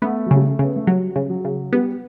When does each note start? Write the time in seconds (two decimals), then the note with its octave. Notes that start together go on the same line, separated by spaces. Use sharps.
0.02 A3 B3
0.26 F#3
0.31 C#3
0.36 G3
0.45 A3
0.59 C#3 B3
0.76 A3
0.87 F#3 G3
1.16 C#3
1.30 F#3
1.45 C#3
1.73 G3 B3